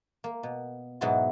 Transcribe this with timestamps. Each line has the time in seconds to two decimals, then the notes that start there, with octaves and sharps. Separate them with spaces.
0.24 A#3
0.43 B2
1.01 G#2 B2 F#3 E4 F#4 A5